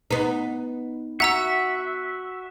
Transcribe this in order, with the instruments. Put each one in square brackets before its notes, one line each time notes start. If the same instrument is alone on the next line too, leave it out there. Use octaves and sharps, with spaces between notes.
[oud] B3 D#4
[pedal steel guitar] F#4 E5 [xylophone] F#5 A#5 E6